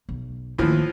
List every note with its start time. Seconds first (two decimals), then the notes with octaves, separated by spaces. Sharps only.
0.09 B1
0.58 D#2 A2 E3 F3